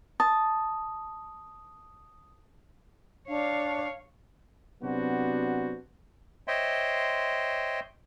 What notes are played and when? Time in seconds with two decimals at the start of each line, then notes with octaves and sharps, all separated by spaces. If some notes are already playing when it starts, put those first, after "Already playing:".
0.20 A5 D#6
3.28 D4 C#5 F5
4.83 C3 F#3 B3 D4 F#4 C5
6.48 C5 C#5 D#5 E5 G5 C6